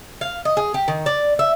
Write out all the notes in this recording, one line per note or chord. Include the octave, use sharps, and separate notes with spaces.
F5
D#5
G#4
G4
D#3
D5
E5